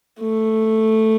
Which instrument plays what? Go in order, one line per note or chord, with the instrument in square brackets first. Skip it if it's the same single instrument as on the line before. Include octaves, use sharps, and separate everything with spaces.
[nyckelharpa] A3